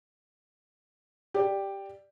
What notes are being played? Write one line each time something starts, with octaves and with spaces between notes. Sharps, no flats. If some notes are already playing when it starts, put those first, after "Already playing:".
G4 D5